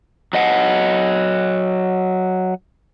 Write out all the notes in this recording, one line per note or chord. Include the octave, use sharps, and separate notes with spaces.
F#3 D#5 F#5